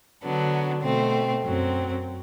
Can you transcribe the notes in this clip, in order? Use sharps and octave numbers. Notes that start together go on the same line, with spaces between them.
D3 F#3 B3 D4
B2 A3 C4
F#2 F#3 C4